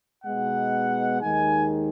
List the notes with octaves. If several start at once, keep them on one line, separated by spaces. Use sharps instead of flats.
B2 G#3 B3 D#4 F#5
D#2 D#3 G#3 D#4 G#5